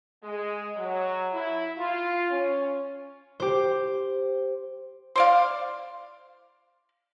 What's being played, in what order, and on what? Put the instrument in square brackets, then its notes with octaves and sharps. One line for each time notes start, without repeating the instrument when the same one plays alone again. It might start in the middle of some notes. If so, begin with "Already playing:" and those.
[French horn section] G#3
F#3
E4
F4
C#4
[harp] G4 C5
[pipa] C5 D5 F5